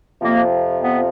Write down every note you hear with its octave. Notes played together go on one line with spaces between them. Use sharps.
F2 C3 F3 A#3
B3